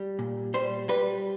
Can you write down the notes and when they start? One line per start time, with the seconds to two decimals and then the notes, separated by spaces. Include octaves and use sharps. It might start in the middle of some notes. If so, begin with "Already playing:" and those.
Already playing: G3
0.19 A#2
0.54 G3 C5
0.89 G3 B4